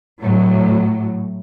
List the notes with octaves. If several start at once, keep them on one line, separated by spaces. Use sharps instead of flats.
A2 F#3